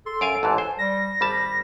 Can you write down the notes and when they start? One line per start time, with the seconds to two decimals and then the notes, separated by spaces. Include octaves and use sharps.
0.06 A4 C6
0.21 F#2 F5 G#5 D7
0.43 A1 G#2 E3 A5
0.58 C5 G#5
0.78 G3 A#6
1.21 G#1 G3 A5 B5